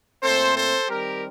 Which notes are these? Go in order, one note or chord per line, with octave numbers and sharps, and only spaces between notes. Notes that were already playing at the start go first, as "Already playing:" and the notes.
A#2 A3 C4 A4 C5
A4 C5
D#3 G3 C4 G4 A#4